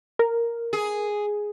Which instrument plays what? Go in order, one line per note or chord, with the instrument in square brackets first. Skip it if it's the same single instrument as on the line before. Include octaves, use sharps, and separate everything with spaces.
[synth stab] A#4
[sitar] G#4